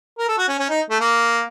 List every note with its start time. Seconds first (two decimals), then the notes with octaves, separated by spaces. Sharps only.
0.18 A#4
0.28 A4
0.38 F#4
0.48 C#4
0.59 C#4
0.70 D#4
0.90 A3
1.00 A#3